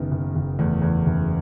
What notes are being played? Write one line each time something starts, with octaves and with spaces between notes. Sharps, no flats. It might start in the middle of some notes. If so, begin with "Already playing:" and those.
Already playing: F#1 D#3 B3
F#1
F#1
E2 A3
E2
F#1